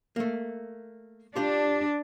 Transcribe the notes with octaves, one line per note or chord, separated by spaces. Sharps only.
A3 A#3
D4 F4 G4 D5